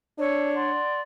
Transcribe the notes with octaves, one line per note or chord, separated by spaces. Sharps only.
D4 C#5 E6
D5 F#5 C6